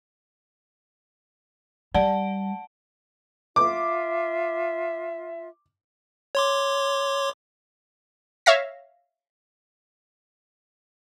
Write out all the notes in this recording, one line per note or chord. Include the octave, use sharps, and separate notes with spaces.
G3 D5 F#5 A5 D7
F4 E5 D6
C#5 C6 D6
C#5 E5 F5 A#6